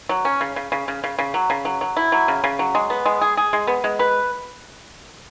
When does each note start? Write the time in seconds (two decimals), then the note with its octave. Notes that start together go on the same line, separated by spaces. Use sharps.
0.09 F#3
0.25 C#4
0.41 C#3
0.56 C#3
0.72 C#3
0.88 C#3
1.04 C#3
1.19 C#3
1.34 F#3
1.50 C#3
1.65 F#3
1.81 F#3
1.97 E4
2.12 F#3
2.28 C#3
2.44 C#3
2.59 F#3
2.75 G#3
2.90 B3
3.06 G#3
3.21 G#4
3.37 G#4
3.53 G#3
3.67 B3
3.84 G#3
3.99 B4